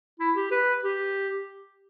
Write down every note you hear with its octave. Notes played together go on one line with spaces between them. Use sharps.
E4
G4
B4
G4